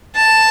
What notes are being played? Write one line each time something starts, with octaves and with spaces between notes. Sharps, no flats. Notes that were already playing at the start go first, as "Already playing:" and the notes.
A5